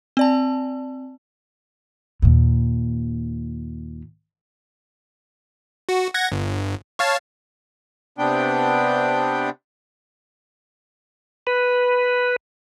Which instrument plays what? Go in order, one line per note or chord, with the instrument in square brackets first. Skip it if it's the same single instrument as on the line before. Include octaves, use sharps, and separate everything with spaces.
[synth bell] C4 D5 A5
[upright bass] D#2 A#2
[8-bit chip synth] F#4
F#5 G#6 A#6
G1
C#5 F5 A5
[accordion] C3 B3 D4 G5
[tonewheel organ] B4